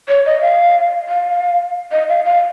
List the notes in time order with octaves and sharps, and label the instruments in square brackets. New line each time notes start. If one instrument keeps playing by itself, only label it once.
[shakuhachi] C#5
D#5
F5
F5
D#5
F5
F5